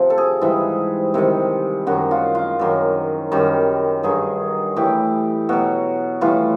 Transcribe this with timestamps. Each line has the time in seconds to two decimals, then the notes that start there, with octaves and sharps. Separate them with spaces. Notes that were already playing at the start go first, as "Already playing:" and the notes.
Already playing: C3 F3
0.10 A4
0.18 G#4
0.41 G#2 E3 G3
1.14 C3 D#3 G3
1.87 F#2 D#3 F#3 F#4
2.11 F4
2.35 F4
2.59 F#2 D#3 F#3
3.32 F#2 D#3 G3
4.03 G2 D#3 F#3 G#4
4.76 A2 E3 G3 G4
5.49 B2 F#3 F#4
6.21 A2 E3 G3 F4